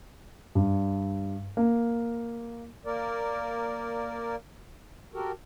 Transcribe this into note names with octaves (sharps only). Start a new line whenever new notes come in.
G2
A#3
A#3 A#4 D5
F#4 G4 A4 A#4